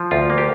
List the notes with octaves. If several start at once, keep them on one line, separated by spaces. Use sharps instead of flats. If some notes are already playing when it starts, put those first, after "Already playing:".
Already playing: F3
D2 F4
A#3
G4